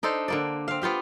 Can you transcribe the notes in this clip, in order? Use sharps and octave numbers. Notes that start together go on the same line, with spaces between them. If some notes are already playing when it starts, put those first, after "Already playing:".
D4 D#4 A4 C5
D3 A#3 D5
C4 F5
B3 F4 G4 F5